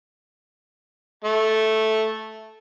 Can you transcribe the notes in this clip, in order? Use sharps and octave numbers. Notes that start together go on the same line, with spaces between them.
A3